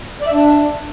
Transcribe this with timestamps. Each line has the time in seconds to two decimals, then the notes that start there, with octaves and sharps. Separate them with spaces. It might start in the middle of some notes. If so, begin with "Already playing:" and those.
0.22 D5
0.27 E5
0.32 D4